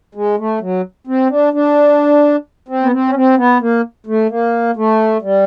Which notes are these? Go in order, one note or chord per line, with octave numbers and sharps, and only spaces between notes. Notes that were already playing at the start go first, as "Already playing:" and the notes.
G#3
A3
F#3
C4
D4
D4
C4
B3
C4
C#4
C4
B3
A#3
A3
A#3
A3
G3